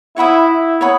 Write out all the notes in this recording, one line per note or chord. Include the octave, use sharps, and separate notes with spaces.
E4 C#5 F#5 B5 D#6
E4
C#5 F#5 B5 D#6